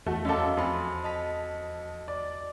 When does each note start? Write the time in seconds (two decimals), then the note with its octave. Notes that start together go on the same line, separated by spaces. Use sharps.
0.06 E2 A3 F#4
0.25 F#2 A4 D#5 F5 D6
0.57 F2 G#5 B5 C6
1.04 D#5 A5 B6
2.08 D5